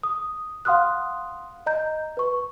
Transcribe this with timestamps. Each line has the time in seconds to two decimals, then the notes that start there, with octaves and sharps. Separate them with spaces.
0.03 D#6
0.65 F5 F#5 C6 D#6 F6 F#6
1.66 D#5 A#5 G6
2.17 B4 C#6